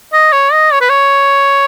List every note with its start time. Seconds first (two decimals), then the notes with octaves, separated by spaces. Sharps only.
0.13 D#5
0.33 C#5
0.52 D#5
0.73 C#5
0.81 B4
0.89 C#5